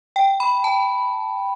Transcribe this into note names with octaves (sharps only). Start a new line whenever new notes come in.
G5
B5
A5